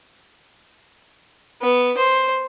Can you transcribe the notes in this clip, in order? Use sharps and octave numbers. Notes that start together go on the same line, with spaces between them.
B3
C5